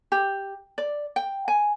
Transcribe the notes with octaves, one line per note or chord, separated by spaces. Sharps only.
G4
D5
G5
G#5